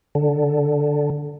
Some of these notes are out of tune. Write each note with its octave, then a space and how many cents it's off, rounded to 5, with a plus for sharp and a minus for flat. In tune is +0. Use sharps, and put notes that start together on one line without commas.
D3 +0